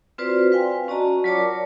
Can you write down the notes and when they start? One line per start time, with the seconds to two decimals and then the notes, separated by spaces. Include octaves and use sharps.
0.18 C4 F4 F#4 B4 C5 D5
0.52 B4 F5 G5 G#5 C6
0.88 C#4 F#4 D5 D#5 A5 A#5
1.24 F#3 F4 C#5 D5 A5 D6
1.37 A#4 C#5